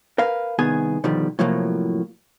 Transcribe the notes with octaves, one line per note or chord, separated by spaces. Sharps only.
A#4 B4 F5
C2 D#3 B3 G#4 G#5
B2 D3 D#3 F3 G3
A2 C3 F3 F#3 A#3